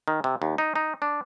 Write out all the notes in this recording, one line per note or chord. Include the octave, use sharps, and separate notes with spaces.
D#3
C3
D#2
D#4
D#4
D4